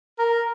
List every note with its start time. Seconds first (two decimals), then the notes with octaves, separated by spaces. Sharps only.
0.19 A#4